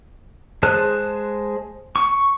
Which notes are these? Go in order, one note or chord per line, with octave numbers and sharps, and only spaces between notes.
G#3 G#4 C5 A5 F#6
C#6